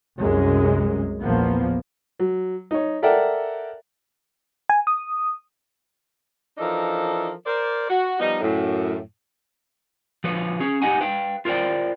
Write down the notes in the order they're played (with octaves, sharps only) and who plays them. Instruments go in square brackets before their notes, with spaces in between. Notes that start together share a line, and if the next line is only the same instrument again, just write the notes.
[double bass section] C2 F#2 C3 G#3
A#1 E2 F3 A#3 B3
[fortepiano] F#3
D#4 C#5
A4 A#4 D5 E5 F#5 G5
[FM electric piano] G#5
D#6
[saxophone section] E3 F3 D4 D#4 A4 A#4
A#4 C5 D5
F#4
F3 G3 B3 D#4
F#2 A2
[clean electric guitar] F3 F#4 B4 C#5
C#4 G#4
D#4 G4 D#5 F#5 G#5
B4 F5 G5
F4 A#4 C5 D5 G5